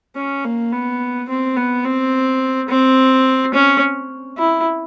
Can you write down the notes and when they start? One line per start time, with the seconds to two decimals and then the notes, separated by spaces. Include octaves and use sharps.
0.16 C#4
0.45 A#3
0.72 B3
1.29 C4
1.57 B3
1.85 C4
2.69 C4
3.54 C#4
4.38 E4